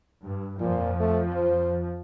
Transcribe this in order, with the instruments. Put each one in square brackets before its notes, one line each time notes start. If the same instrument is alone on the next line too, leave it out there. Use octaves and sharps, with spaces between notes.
[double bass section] G2
[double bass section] F2 F3 [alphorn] A#2
[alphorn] A3
C5